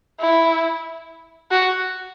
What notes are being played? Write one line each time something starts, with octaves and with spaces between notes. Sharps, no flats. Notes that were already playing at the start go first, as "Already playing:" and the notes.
E4
F#4